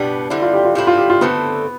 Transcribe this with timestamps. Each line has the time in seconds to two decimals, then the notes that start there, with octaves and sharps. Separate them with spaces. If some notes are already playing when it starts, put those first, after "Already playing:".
Already playing: B2 G3 B3 D4 G4
0.30 D3 G3 C4 E4
0.42 F4
0.54 G4
0.65 F4
0.75 A2 G3 C4 E4 G4
0.87 F4
0.98 G4
1.10 F4
1.21 D3 A3 B3 C4